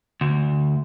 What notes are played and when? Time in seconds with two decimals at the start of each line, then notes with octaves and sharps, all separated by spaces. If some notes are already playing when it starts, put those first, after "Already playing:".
0.21 D2